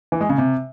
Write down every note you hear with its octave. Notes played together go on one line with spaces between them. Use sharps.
E3
G#3
C#3
C3